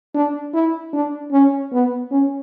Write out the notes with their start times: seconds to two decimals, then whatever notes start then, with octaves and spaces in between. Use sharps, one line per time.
0.15 D4
0.53 E4
0.93 D4
1.32 C#4
1.72 B3
2.11 C#4